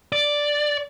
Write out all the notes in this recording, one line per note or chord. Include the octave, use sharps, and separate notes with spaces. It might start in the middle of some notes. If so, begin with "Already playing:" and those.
D5